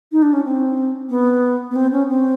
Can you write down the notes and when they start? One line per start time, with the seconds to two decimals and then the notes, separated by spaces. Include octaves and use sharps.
0.12 D#4
0.22 D4
0.33 C#4
0.45 C4
1.10 B3
1.71 B3
1.76 C4
1.92 C#4
2.08 C4